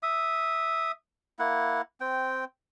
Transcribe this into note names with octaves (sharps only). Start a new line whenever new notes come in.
E5 D#6
A#3 E4 F#5
C4 G5